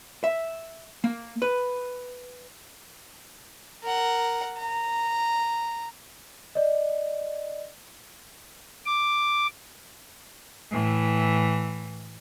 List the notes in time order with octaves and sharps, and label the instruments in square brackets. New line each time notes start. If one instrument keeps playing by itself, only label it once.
[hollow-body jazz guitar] E5
A#3
B4
[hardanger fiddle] A#4 F#5
A#5
[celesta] D5 D#5
[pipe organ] D6
[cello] A2 E3